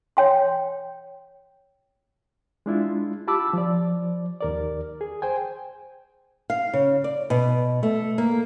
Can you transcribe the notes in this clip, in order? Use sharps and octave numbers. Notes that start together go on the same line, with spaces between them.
C#5 G5 C6
G#3 D4 E4 F4
F4 G4 A5 B5 D6 E6
F3 D5
D#2 A#4 D5
G#4
C5 G5 G#5
F5
C#3
D5
B2
A3
A#3